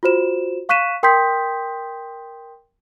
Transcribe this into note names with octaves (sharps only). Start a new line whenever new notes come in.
F4 F#4 C5 E7
F5 C#6 F#6 B6 D#7 E7
A#4 G5 C6 D#6 G6 B6